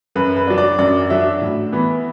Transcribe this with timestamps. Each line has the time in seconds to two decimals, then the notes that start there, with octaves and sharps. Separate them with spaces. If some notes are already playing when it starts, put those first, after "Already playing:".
0.16 F#2 B4
0.37 B4
0.47 F#3 D4
0.58 D5
0.79 F#2 D5
1.10 F#3 D4 E5
1.41 A2
1.72 E3 B3